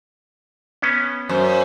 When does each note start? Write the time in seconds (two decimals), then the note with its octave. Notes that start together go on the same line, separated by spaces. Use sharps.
0.82 B3 C#4
1.29 F#2 C5